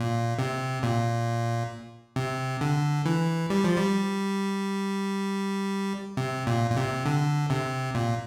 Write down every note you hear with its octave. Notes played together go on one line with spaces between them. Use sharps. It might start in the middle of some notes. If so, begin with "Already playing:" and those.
Already playing: A#2
C3
A#2
C3
D3
E3
G3
F3
G3
C3
A#2
A#2
C3
D3
C3
A#2